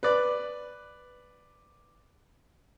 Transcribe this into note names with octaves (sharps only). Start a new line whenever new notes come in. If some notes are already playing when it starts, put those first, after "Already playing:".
B4 D5